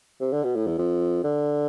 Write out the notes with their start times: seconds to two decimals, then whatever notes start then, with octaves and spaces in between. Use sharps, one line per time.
0.21 C3
0.32 D3
0.44 B2
0.56 A2
0.67 E2
0.78 F2
1.24 D3